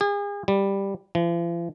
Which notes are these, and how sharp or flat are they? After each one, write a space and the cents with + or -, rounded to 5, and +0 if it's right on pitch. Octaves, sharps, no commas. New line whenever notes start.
G#4 -40
G3 +5
F3 -45